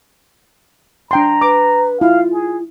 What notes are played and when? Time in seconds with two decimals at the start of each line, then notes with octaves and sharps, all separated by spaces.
1.11 D4 G5 A#5 C6
1.41 B4 D6
2.01 E4 F4 F5
2.32 G#4